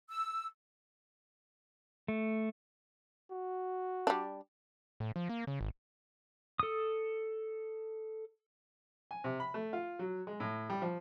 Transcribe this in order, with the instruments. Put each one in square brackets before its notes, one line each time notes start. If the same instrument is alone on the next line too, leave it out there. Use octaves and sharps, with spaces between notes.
[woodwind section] E6
[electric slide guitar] A3
[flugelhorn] F#4
[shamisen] G3 D4
[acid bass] A2
F3
A#3
C#3
G#1
[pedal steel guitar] A4 D#6
[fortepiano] G#5
C3
B5
A3
F4
F#3
G#3
A2
G3
F3